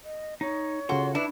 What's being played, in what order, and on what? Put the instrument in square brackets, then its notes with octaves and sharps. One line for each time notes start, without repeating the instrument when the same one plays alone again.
[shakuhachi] D#5
[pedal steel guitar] D#4 [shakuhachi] C#5
[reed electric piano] C#3 F4 A4 [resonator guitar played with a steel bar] F#4 [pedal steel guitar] C6
[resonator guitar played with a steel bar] D4 [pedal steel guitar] E4 [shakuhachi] B4